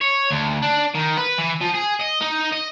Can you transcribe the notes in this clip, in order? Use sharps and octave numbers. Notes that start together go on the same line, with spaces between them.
C#5
D2
D4
D#3
B4
E3
F3
G#4
D#5
D#4
D#5